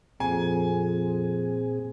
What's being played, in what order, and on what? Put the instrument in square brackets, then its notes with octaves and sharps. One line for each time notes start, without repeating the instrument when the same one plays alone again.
[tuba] F2 [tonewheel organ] A#2 C4 G#4 [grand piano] G#5